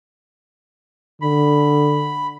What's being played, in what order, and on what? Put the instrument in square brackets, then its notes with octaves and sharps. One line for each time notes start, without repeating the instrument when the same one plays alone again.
[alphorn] D3 [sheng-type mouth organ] B5